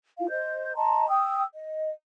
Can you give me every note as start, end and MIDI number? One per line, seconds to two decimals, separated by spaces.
0.18 0.27 64
0.18 0.27 65
0.18 0.27 77
0.30 0.72 72
0.30 0.72 75
0.30 0.72 91
0.75 1.06 75
0.75 1.06 81
0.75 1.06 82
0.75 1.06 84
1.09 1.43 79
1.09 1.43 87
1.09 1.43 88
1.53 1.91 75